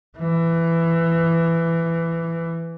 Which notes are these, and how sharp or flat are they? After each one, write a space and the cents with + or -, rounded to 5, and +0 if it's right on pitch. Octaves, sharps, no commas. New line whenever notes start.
E3 +15